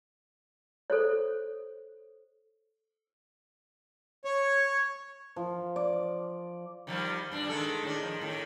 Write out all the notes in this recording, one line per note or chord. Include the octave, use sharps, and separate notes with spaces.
A4 C5 C#5
C#5
F3
D5
D#3 F3 G3
G2 D4
D#3 G#3 A4
A2 D#3 D4
D#3 F3
A2 D#3